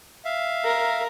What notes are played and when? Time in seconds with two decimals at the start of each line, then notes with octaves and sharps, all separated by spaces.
0.25 E5 F5
0.64 A#4